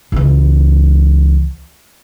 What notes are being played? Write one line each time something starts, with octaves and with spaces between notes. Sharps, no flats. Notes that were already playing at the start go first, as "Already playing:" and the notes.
C#2 E3